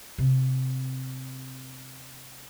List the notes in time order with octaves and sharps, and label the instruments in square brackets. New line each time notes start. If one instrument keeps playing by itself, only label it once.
[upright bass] C3 C4